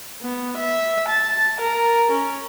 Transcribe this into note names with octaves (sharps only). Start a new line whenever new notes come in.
B3
E5
A5
A#4
C#4